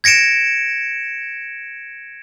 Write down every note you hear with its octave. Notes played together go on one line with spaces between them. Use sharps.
G#6 A#6 C#7 D7 E7